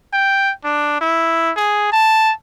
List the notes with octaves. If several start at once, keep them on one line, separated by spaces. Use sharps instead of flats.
G5
D4
E4
G#4
A5